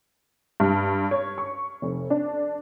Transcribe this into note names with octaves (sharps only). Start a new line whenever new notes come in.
G2
C#5
C#6
F1
D4